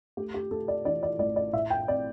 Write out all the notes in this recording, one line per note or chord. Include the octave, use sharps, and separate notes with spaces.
A3 G4
G4
A3 A4
D5
E3 D5
D5
A1 D5
D5
A2 E5
G5
C4 D5